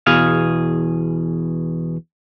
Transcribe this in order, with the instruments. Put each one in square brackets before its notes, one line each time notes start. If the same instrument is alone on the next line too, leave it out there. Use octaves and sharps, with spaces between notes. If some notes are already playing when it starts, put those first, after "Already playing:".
[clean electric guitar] E2 B2 G#4 F5